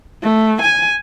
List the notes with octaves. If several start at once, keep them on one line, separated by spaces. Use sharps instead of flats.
A3
G#5